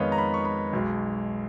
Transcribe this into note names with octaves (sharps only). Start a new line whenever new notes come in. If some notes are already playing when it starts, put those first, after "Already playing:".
Already playing: F2 D#3 G#3 B3 C#5 D#5 F5
A#5
B5
C#6
B5
B1 B2 G#3